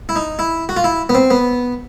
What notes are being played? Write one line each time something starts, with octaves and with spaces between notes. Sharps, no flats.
E4
D#4
E4
F#4
F4
E4
B3
C4
B3